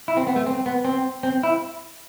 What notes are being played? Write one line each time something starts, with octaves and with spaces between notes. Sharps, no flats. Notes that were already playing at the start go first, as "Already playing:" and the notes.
E4
C4
B3
A3
C4
B3
C4
C4
E4